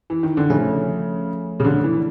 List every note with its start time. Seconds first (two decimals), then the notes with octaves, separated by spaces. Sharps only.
0.10 E3
0.23 D#3
0.37 D3
0.50 C#3 F3 A3 C#4
1.60 C#3
1.65 D3
1.84 E3